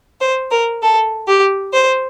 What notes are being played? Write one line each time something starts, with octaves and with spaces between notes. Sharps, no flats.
C5
A#4
A4
G4
C5